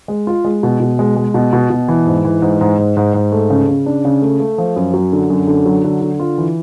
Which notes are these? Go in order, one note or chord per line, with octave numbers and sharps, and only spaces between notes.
G#3
F4
G#3
B2
B2
G#3
G#3
B2
B2
B2
E3
G#2
E3
G#2
G#2
G#2
G#2
G#2
A3
C#3
C#3
D4
C#3
A3
A3
F3
F#2
F#3
D3
F#2
D3
F#3
D3
D3
F4
E3